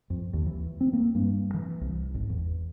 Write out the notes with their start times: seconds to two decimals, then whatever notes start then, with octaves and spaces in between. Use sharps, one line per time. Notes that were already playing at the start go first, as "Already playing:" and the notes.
0.10 F2
0.33 D#2
0.46 E3
0.81 C4
0.93 A#3
1.15 G2
1.54 E3
1.81 C2
2.15 G#1
2.29 E2